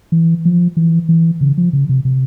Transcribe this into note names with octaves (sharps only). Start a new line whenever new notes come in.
E3
F3
E3
E3
C#3
F3
C#3
C3
C3